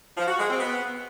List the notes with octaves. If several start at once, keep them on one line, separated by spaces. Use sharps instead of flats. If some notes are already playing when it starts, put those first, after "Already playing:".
F3
F#4
G#3
C4
B3